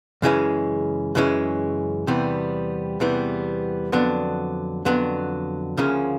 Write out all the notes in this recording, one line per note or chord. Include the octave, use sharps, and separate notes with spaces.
F#2 C#3 E3 G#3 C#4
F#2 C#3 E3 G#3 C#4
E2 C3 E3 G3 B3
E2 C3 E3 G3 B3
F2 D3 F#3 B3 D4
F2 D3 F#3 B3 D4
D2 C#3 F3 A#3 C#4